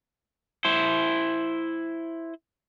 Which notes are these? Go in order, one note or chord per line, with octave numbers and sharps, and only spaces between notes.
E4 C5